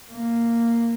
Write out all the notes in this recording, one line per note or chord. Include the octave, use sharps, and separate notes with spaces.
A#3